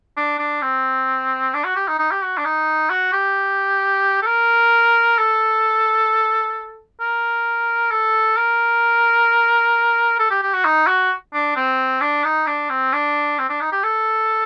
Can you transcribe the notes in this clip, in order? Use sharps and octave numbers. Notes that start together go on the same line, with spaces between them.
D4
D4
C4
D4
F#4
G4
D#4
D#4
G4
F#4
D4
D#4
F#4
G4
A4
A#4
A4
A#4
A4
A#4
A4
G4
G4
F#4
D#4
F#4
D4
C4
D4
D#4
D4
C4
D4
C4
D4
D#4
G4
A4